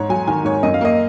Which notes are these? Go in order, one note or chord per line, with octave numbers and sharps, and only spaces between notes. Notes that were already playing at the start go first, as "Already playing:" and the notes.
Already playing: G#2 C#5
F#3 G#5
D#3 G#5
G#2 C#5
F#2 D#5
F5
A#3 D#5